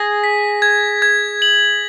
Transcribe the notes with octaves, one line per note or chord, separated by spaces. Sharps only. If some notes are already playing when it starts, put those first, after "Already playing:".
Already playing: G#4 A#6
B6
G#6
G#6
F#7